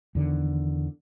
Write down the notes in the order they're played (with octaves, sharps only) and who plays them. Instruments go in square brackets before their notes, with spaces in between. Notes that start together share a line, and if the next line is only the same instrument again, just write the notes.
[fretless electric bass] E2 D3 D#3